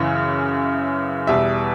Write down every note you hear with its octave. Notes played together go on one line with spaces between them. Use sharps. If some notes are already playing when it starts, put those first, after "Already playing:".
Already playing: F#2 C#3 E3
E2 B2 G3 E5